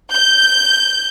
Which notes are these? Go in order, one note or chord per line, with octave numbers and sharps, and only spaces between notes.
G6